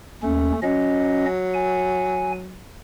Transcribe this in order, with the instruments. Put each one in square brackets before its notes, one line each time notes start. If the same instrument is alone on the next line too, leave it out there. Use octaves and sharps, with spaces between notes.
[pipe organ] D#2 C#4 [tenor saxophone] A3
[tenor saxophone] F#3 [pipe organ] C#4 D#5
[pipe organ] G#5